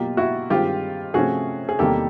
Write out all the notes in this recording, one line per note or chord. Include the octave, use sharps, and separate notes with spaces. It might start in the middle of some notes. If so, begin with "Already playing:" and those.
Already playing: B2 F#3 A#3 F4 G4
E4 F#4
G2 D#3 G#3 C4 F4 G4
C3 F3 A3 C#4 F#4 G#4
G#4
E2 C3 D#3 G3 A#3 G4 A4